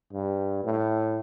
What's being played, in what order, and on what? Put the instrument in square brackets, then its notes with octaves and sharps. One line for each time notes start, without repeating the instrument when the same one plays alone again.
[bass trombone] G2
A2